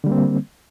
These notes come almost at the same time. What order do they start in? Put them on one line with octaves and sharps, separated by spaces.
D3 G3 A#3 C4